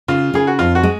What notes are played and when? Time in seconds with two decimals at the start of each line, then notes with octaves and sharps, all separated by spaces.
0.08 C#3 F4
0.34 C#3 G#4
0.47 F#4
0.59 F2 F4
0.75 F#4
0.83 G#3